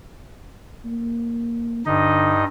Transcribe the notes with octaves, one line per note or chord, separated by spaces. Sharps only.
A#3
G2 D3 D#4 D#5